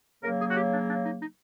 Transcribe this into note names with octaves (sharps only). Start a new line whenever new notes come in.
C#3 F#3 A#3 A#4
G#4
F#4
G4
D4
D4
D#4
D#4